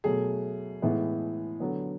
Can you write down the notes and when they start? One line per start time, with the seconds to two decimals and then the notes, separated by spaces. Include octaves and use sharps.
0.04 B2 F#3 A3 G#4
0.82 A2 E3 G#3 B3
1.60 D3 F#3 B3